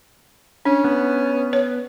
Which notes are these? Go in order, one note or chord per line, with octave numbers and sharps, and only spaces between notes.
C#4 D4
B3
C#5